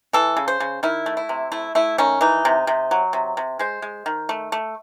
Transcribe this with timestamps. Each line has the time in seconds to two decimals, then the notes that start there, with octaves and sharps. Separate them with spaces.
0.13 E3 A4
0.37 C#3
0.48 C5
0.60 C#3
0.83 D#3 E4
1.06 A3
1.17 E4
1.29 C3
1.52 A3 E4
1.75 A3 E4
1.98 D#3 C#4
2.21 E3 D#4
2.45 C3
2.67 C3
2.91 F#3
3.13 C3
3.37 C3
3.59 G#3 C5
3.82 G#3
4.06 D#3
4.29 A3
4.52 A3